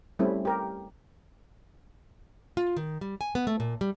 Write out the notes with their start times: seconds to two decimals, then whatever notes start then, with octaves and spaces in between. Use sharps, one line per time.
0.19 G3 A3 C4 C#4 E4
0.45 G4 A#4
2.57 F4
2.77 D#3
3.01 G3
3.21 G#5
3.35 B3
3.47 A3
3.60 A#2
3.81 G3